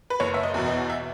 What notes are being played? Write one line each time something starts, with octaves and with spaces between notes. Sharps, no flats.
B4
F#1 C#5
E5
D#5
E2 B2
D#5
E5